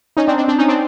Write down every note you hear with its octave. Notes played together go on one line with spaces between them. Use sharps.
C#4 D#4
C4 D4
C4 D4
C4 D4
C#4 D#4
C4 D4